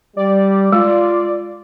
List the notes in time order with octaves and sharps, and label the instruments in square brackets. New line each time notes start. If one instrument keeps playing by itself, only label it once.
[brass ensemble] G3 [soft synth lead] D5
[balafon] G#3 [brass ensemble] F4